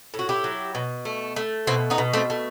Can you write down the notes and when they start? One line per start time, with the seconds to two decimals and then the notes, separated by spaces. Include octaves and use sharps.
0.14 A2
0.19 F#4
0.29 E4 G4
0.44 F#3
0.75 B2
1.05 A3
1.36 A3
1.67 B2 C4 E4
1.90 B3 D#4
1.98 B2
2.13 A3 C4
2.30 A3